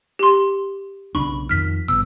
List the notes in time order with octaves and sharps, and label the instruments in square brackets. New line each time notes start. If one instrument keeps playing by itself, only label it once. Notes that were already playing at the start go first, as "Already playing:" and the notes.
[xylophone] G4 C6
[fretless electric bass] B1 C#3 D4 [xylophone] B5 C#6
[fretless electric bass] F2 D#3 [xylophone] F6 B6
[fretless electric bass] G1 B2 [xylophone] E6